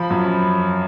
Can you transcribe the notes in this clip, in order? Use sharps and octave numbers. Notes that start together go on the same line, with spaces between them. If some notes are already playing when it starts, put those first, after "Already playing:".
Already playing: F3 B5
F#2